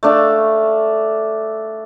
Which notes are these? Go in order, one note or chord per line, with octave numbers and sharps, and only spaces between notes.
A3 D4 F5